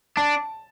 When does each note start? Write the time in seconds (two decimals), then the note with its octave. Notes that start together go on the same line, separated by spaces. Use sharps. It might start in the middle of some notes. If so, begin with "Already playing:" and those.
0.17 D4 A5